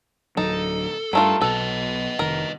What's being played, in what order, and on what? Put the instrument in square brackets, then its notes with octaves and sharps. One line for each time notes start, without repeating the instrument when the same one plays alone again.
[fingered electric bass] D1 G1 F#3 [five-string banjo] D#4 [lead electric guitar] A4
[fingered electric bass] G2 [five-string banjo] D#3 A3 F4
[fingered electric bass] B1 B2 [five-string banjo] A4 [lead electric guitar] B4 D#5
[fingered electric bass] F1 D#3 [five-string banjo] A#4